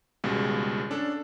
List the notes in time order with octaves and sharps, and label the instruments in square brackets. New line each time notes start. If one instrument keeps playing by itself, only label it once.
[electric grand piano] G#1 C#2 B2 G3 G#3
C#4 D4 A4